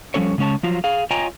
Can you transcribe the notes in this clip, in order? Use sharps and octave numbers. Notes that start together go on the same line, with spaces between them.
F3 G3 C#4 A4 C#5
C#3 G#3 C#4 C#5 A5
F3 F#3 F4
G#4 F5
F4 C#5 D#5 G5 G#5 A#5